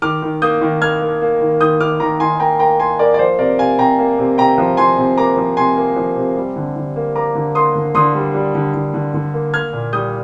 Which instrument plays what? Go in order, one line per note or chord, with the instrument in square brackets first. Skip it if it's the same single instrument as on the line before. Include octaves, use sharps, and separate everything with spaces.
[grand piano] D#3 D6 F6
D#3
A#3 D#6 G6
D#3
A#3 F6 G#6
A#3
A#3
D#3
D#3 D#6 G6
D#3 D6 F6
D#3 A#5 D6
D#3 G#5 C6
A#3 G5 A#5
A#3 G5 A#5
A#3 G#5 C6
A#3 A#4 D5
D5
F3 C5
C3 A#4 D5
C3 F5 G#5
C3 G5 A#5
A#3
C3
C3 G5 A#5
F3
F3 G#5 C6
C3
A#3 A#5 D6
F3
C3 G#5 C6
A#3
F3
C3
G3
D3
D3
A#3
A#3 A#5 D6
D3
A#3 C6 D#6
D3
D3 C6 D#6
G3
G3
D3
D3
D3
D3
A#3
A#3 F6 G#6
A#2
G3 D#6 G6